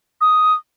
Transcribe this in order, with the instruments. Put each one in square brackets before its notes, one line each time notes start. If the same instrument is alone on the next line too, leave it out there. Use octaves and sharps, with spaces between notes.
[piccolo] D#6